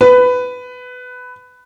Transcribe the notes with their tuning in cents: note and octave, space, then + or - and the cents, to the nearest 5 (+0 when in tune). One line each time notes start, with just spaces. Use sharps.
B4 +15